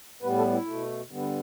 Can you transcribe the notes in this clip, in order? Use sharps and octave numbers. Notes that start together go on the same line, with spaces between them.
A2 G3 B3 B4
A4
E4
B2 A3
G2 D3 G3 B3